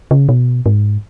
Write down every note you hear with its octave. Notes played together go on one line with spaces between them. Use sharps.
C#3
B2
G#2